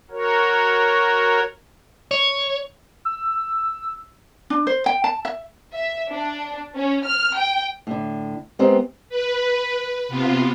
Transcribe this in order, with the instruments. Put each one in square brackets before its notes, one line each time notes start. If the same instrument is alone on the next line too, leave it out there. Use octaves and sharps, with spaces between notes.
[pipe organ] F#4 A#4 C#5
[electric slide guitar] C#5
[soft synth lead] E6
[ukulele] D4
C5
G5
A5
E5
[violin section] E5
D4
C#4
F6
G5
[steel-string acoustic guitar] A2 D3
G#3 B3 C4 G4 A#4 C5
[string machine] B4
C3 B3 F4